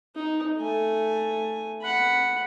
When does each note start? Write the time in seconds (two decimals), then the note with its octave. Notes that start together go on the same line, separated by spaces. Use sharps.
0.16 D#4
0.58 A3 G#5
1.82 F#5 B5